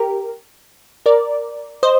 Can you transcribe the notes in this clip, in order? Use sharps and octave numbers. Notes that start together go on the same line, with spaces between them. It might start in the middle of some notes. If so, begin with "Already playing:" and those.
Already playing: G4 A#4
A#4 D5
C5 D#5